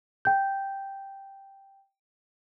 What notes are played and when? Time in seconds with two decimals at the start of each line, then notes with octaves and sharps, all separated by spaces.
0.25 G5 G6